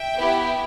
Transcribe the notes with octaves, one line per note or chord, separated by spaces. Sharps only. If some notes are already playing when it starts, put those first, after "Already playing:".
Already playing: E5 G5
B3 E4 G4